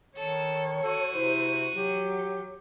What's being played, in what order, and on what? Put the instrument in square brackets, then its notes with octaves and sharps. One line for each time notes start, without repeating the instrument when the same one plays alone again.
[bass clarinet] D#3 [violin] A4 E6 [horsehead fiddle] C#5
[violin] F#4 D#7 [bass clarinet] A4
[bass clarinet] C3 [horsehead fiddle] E4 C5
[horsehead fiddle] F#3 [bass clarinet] G4